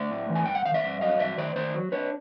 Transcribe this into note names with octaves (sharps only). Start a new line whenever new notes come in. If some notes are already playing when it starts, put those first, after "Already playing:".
Already playing: A3 D5 E5
A2
E3
G#5
G2 G5
F#5
D#3 F5
D5 E5
G2
F#3 D#5 F5
G2 D5 E5
D#3 C5 D5
D#3 C5 D5
F#3
D4 B4 C#5